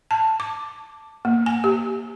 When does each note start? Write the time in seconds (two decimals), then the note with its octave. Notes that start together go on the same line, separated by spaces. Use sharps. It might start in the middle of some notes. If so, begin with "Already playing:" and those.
0.11 A5
0.40 D6
1.25 A#3
1.46 G#5
1.64 G4